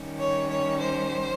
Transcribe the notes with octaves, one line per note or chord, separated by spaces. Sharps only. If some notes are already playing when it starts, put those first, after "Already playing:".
Already playing: D#3 G3 C#4
C#5
C#5
C5